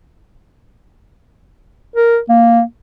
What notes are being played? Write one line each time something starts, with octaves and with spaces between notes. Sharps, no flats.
A#4
A#3